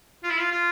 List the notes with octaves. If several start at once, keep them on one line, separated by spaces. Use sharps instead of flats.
F4
E4
F4
F4